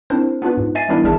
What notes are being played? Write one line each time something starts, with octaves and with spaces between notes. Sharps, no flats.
C4 D4 E4 A#4 C5
B3 D4 F4 B4
G#2
D#5 E5 G#5 A6 C7 D#7
E3 G3 B3 D4 E4 A#4
G#1 G3 G#4 A#4 E5 A5